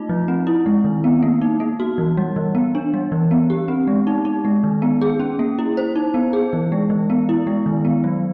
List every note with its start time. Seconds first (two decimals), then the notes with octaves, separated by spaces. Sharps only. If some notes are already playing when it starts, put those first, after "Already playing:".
Already playing: A3 D#4 F4
0.09 F3
0.28 C4
0.47 E4
0.66 G#3
0.84 D#3
1.04 B3
1.23 A#3
1.42 D#4
1.60 A#3
1.80 F#4
1.98 E3
2.17 G3
2.36 E3
2.55 B3
2.75 D4
2.94 G3
3.12 E3
3.31 B3
3.50 G4
3.68 C4
3.87 G#3
4.07 D#4
4.25 D#4
4.45 G#3
4.64 D#3
4.82 B3
5.01 G#4
5.20 C#4
5.39 A#3
5.59 E4
5.77 C5
5.96 D#4
6.14 B3
6.33 G#4
6.53 E3
6.72 G#3
6.90 E3
7.10 B3
7.29 E4
7.47 G#3
7.66 D#3
7.85 B3
8.04 F#3